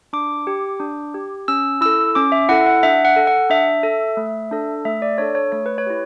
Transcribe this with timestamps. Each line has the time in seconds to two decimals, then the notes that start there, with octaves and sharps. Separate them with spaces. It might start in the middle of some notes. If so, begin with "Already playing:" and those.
0.13 D4 D6
0.47 G4
0.80 D4
1.14 G4
1.48 C#4 E6
1.81 E4 A4 E6
2.15 C#4 D6
2.32 E5
2.49 E4 A4 F#5
2.66 F#5
2.83 D4 E5
3.05 F#5
3.16 A4
3.27 F#5
3.50 D4 E5
3.83 A4
4.17 A3
4.51 D4 A4
4.85 A3 E5
5.02 D5
5.18 D4 A4 C#5
5.35 C#5
5.52 A3 C#5
5.66 B4
5.78 C#5
5.87 E4 G4